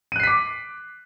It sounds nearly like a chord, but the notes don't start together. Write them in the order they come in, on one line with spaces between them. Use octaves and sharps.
D#7 F#6 C7 B6 D6